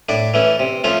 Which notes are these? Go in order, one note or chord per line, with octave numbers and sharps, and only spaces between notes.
A2 D4 D5
E3 A3 C#4
C3
F3 A3 C#4 F4